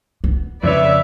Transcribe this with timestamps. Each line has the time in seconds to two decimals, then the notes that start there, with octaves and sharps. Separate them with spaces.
0.24 B3
0.63 F2 C#3 B4 C#5 D5 E5